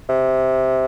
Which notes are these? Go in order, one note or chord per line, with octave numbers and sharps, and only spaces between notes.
C3